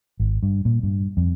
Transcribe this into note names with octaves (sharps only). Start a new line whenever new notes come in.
G#1
G2
A#2
G2
F2